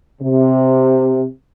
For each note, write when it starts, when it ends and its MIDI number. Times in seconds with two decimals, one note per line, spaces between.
0.22 1.26 48